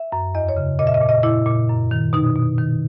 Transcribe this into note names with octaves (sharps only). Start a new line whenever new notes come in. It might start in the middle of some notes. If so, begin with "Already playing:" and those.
Already playing: E5
F#2
E2 D#5
C#5
C#3
A#2 D#5
E5
D#5
A#2
D#5
A#2 E4
A#2
F#2
D#3
B2 D#4
B2
D#3